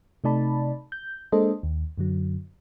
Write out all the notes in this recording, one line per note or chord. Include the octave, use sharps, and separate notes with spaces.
C3 A3 D#4 D5 A5 B5
G6
G#3 A#3 D4 A4 C5 D#5
D#2
F#2 D3 F#3